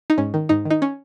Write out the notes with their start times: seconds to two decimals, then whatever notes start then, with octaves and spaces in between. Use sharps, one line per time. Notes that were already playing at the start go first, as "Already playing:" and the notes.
0.10 D#4
0.18 G#2 C#4
0.34 D#3
0.49 G#2 D#4
0.65 D#3
0.70 D#4
0.82 C#4